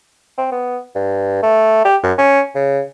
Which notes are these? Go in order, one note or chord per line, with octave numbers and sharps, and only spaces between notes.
C4
B3
G2
A3
G4
F#2
C#4
C#3